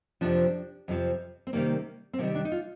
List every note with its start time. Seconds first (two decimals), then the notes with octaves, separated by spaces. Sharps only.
0.21 F2 C3 F3 D4
0.88 F2 C3 F3
1.47 C4
1.53 C3 D#3 G3 A#3
2.13 C4
2.18 C3 D#3 G3 A#3
2.35 D4
2.45 D#4
2.52 F4